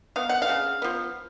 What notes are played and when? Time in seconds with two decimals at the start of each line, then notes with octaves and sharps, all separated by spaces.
0.16 B3 F5
0.29 F#5
0.42 F5
0.49 C#3
0.82 F3 B3